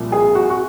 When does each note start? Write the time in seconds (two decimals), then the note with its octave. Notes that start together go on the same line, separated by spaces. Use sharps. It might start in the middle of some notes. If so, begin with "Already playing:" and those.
Already playing: C2 A#2 F3
0.12 G#4
0.35 F#4
0.50 F#4